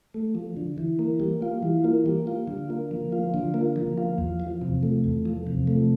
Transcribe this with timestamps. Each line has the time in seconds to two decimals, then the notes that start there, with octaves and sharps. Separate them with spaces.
0.14 A3
0.35 F3
0.57 D3
0.78 E3
0.99 A#3
1.20 G3
1.42 F4
1.63 E3
1.84 A#3
2.06 G3
2.27 F4
2.48 D3
2.70 A#3
2.91 F3
3.12 F4
3.34 D3
3.54 A#3
3.76 F3
3.98 F4
4.18 E2
4.40 F3
4.61 C3
4.83 A3
5.04 E2
5.25 F3
5.47 C3
5.67 A3